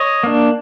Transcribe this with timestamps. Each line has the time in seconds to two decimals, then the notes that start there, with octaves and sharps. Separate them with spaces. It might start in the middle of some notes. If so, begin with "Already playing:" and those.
Already playing: C#5 D#5
0.23 A#3 D4